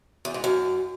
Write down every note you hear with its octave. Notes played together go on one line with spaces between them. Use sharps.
E2
G#2
F#2